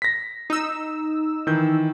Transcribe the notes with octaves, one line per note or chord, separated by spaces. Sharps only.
A#6 B6
D#4 E6
D#3 E3 G6